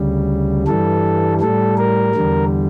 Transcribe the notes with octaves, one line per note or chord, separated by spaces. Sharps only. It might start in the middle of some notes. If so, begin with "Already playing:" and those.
Already playing: D2 C#3 G3
G2 E3 G3 A4
A2 G3 A4
A#4
E2 D3 G3